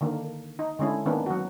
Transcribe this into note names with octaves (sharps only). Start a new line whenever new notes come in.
D3 D#3 A#3
D#4
D3 G#3 C#4 E4
D#3 A#3 B3 C#4 D4
F#3 F#4